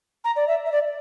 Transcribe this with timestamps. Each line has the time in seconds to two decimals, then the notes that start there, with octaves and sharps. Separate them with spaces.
0.24 A#5
0.36 D5
0.48 E5
0.66 E5
0.72 D5